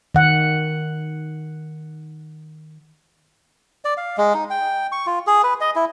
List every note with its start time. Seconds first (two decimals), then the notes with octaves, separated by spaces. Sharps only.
0.15 D#3 F#5
3.85 D5
3.97 F5
4.17 G#3
4.34 D#4
4.50 G5
4.92 C#6
5.07 F4
5.27 G#4
5.43 B4
5.61 D#5
5.76 E4